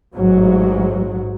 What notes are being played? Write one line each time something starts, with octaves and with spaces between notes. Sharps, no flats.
A1 G#2 F#3